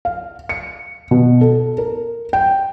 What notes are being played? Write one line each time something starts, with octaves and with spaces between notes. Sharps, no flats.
F5
C#7
B2
A4
A#4
G5